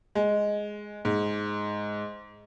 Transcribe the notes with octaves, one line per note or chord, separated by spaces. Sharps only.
G#3
G#2